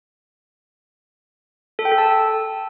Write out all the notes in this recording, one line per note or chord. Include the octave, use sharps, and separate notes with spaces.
A4
G5
A4
A5